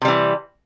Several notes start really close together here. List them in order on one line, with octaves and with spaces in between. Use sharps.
C3 G3 E3